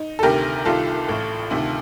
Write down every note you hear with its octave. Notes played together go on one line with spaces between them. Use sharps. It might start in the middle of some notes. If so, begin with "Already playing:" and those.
Already playing: D#4
A4
D2 C3 D#3 G4 A#4
C2 C3 D#3 F4 A4
A1 A2
D2 C3 D#3